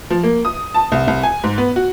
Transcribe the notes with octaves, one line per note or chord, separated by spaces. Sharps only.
F3
A#3
D#6
A5
C2
C2
G#5
G#2
B3
F#4